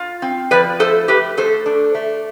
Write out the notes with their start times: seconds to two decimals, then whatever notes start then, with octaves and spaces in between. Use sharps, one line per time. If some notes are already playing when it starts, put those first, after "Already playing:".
Already playing: F4
0.22 C4
0.51 F3 B4 D5
0.80 A3 A4 C5
1.08 A3 G4 B4
1.37 A3 A4 C5
1.66 D4
1.95 A3